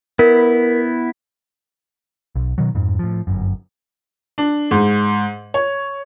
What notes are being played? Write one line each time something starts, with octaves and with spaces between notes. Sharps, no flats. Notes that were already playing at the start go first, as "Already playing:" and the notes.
B3 E4 A#4
B1
B2 D#3 F#3
F2 G#2
A2 F3
G1 F#2
D4
G#2
C#5